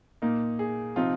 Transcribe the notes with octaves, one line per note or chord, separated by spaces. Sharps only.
A#2 A#3 D#4
G#4
C3 F3 C4 D#4 F4